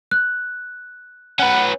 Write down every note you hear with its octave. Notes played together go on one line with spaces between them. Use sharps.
F#6
C#4 B4 F#5